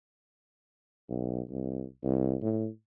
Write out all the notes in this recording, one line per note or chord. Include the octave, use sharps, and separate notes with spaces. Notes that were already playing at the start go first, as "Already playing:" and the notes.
B1
C2
C2
A2